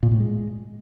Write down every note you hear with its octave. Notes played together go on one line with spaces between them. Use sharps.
A#2
A2
G#3